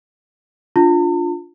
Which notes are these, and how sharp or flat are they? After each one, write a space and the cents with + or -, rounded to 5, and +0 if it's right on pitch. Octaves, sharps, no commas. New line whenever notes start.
D4 -10 F4 +0 A5 +45